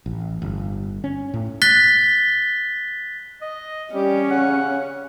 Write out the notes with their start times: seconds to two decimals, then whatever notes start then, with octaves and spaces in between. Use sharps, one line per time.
0.06 A1
0.42 G1
1.04 C#4
1.34 A2
1.62 F#6 A6 B6 G7
3.41 D#5
3.94 G3 C#4 G4
4.31 C#3 F#5